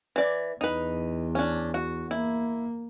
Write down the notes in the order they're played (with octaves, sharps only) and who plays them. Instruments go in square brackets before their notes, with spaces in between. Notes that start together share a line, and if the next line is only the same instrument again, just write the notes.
[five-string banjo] E3 D5
[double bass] E2 [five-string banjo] D#4 B4
[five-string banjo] C#4 D4
F#4
[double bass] A#3 [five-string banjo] E4